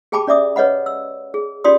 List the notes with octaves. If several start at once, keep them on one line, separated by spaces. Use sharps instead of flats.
G4 G#4 G5 A5 B5 D6
C#4 D5 E5 D6 D#6
B4 C#5 D#5 F#5 B5
E6
G#4
C#4 F4 G4 D5 C6 D#6